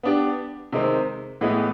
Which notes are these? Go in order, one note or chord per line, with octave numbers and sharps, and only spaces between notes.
B3 D4 G4
C3 D#3 G#3 C4
A2 E3 G#3 B3